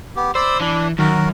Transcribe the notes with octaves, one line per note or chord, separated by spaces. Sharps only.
B3 G4
C5 D5 B5 E6
E3 D4
F#2 D#3 F#4 A#4